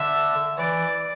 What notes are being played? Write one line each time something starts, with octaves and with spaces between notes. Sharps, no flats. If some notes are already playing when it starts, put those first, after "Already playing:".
Already playing: D3 E5
E3 D5